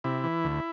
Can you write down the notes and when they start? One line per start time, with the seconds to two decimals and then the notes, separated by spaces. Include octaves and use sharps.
0.04 C3 E4
0.24 E3
0.44 D2